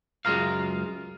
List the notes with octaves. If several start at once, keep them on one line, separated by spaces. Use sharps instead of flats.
C#2 F#2 G#3 F4 A#4 F5